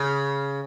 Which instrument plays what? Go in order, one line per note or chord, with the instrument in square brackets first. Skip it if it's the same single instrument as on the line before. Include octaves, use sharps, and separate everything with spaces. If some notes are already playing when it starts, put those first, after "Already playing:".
Already playing: [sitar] C#3